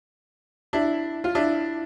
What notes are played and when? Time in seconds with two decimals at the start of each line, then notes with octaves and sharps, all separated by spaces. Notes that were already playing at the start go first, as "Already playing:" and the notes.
0.73 D4 E4
1.24 F4
1.35 D4 E4